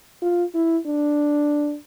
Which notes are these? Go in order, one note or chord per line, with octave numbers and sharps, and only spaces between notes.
F4
E4
D4